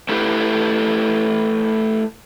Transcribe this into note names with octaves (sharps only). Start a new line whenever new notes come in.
A3 E4 G4 B4